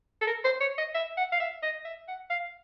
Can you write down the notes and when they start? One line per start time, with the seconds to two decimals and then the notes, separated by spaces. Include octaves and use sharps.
0.21 A4
0.27 A#4
0.44 C5
0.61 C#5
0.78 D#5
0.94 E5
1.17 F#5
1.32 F5
1.40 E5
1.62 D#5
1.85 E5
2.08 F#5
2.30 F5